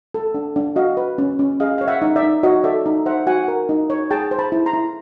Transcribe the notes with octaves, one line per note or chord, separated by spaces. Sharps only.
A4
D4
D4
F#4 D#5 F5
B4
C#4
C#4
G#4 D#5 F5
C#5 F5
E5 F#5
D#4
D5 E5
D#4
F#4 C#5 D#5
A4 D5 E5
D#4
C5 E5 F#5
F#4 F#5 G#5
A#4
D#4
C#5
G#4 G5 A5
C5
A5 B5
E4
A#5 C6
E4